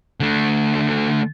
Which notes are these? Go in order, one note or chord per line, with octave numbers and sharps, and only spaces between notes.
D3 A3